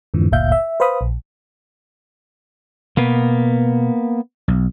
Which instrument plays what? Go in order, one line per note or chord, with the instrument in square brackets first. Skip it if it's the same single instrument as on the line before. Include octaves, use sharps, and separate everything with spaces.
[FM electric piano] F2 G#2 D3 E3 F3
G1 D2 A#2 E5 F5 G6
E5
B4 C5 F5 B5 D#6
A#1
[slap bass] B2 [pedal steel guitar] A#3 B3
[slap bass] B1